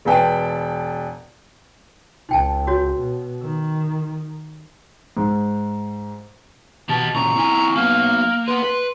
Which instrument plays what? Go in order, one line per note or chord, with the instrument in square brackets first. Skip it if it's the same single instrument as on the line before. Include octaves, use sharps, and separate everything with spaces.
[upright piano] E1 B4 G5 A5
[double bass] C#2 [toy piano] D#4 G5 A5
[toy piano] F#4 C#5
[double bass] B2
D#3
[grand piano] G#2
[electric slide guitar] B2 [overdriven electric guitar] G4 D#5 [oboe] A5
[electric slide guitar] A#2 C#3 [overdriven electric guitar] A#5 [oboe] C#6
[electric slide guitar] C4 E4 G#5
[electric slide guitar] F#3 B3 [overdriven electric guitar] A#3 [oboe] F5
[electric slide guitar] B4 F#5 [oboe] C6
[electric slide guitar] B4